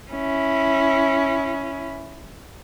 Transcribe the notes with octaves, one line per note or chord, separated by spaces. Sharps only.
C#4 E4